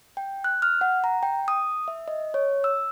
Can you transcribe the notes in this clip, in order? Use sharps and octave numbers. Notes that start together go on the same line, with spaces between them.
G5
F#6
F6
F#5
A#5
G5
D#6
E5
D#5
C#5
E6